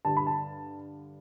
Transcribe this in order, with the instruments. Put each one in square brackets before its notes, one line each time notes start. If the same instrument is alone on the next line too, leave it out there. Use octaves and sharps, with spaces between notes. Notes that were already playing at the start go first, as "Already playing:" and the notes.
[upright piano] G2 D3 A5
B5
A5